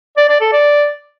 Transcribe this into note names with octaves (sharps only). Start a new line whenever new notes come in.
D5
D5
A4
D5